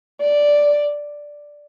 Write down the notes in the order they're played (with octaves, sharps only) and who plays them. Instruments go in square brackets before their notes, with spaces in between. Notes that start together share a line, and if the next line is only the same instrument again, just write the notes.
[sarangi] D5